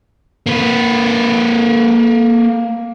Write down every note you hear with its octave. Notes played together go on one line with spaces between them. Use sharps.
A#3 B4